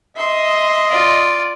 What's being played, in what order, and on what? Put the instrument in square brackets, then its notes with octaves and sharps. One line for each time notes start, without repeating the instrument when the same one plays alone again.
[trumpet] D#5 [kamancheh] E5 C6
[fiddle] F4 D5